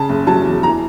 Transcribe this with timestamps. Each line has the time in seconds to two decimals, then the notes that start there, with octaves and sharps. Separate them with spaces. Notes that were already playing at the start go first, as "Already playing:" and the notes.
Already playing: C#3 A5
0.09 F#1
0.27 F#3 A5
0.46 E2
0.63 E3 A#5